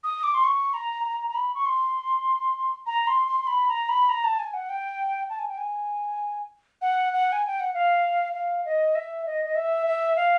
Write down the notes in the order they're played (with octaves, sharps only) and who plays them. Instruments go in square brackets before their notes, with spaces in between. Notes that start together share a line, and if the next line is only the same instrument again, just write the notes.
[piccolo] D#6
D6
C6
C#6
A#5
A#5
A#5
B5
C#6
C6
A#5
C6
C6
C6
B5
A#5
B5
A#5
A5
G#5
F#5
G5
A5
G#5
G5
G#5
F#5
F#5
G#5
G5
F#5
F5
F5
D#5
E5
D#5
D#5
E5
E5
F5